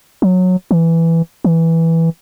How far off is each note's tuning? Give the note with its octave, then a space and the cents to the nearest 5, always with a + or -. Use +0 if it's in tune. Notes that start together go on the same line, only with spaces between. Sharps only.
F#3 -15
E3 +5
E3 -5